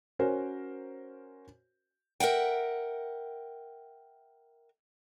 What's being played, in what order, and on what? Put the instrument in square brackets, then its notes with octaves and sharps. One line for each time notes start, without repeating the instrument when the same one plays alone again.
[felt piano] C#4 F#4 A#4 C5
[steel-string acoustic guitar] A#4 E5 F#5 G5